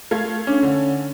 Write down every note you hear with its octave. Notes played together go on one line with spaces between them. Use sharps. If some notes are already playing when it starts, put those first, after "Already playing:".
A3 F5 G#6
C#4 D4
D3